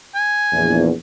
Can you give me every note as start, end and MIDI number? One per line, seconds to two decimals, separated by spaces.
0.15 0.84 80
0.52 0.91 34
0.52 0.91 40